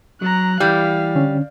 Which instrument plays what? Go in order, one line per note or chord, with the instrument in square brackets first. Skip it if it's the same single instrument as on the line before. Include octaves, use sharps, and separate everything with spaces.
[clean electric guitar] F#3 [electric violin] A#5 F#6
[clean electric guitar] E3 [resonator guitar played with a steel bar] G3 [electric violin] F5
[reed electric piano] D3 C#4